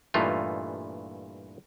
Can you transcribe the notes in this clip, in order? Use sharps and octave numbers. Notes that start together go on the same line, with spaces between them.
G2 A#2 E3 A3 D#4 F4